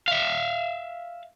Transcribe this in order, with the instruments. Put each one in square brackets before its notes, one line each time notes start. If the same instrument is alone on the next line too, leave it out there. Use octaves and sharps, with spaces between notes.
[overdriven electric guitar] E5 F5